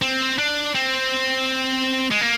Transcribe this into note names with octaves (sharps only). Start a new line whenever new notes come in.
C4
D4
C4
G#3
A#3